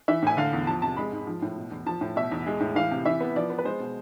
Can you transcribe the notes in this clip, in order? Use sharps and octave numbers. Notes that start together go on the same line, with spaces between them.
E3 E5
A2 G#5
D3 F5
E2
F3 A5
C3 A5
G#3 B5
G#2
F3
A2
B2
E2
F3 A5
A2
B2 E5
E2
G#3
A2
E3 F5
C3
E3 E5
B3
F3 D5
B3
B4
G#3 C5
B2